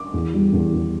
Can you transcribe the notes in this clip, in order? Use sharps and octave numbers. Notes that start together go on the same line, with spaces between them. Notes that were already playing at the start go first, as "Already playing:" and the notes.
Already playing: D6
E2
G3
E2
E2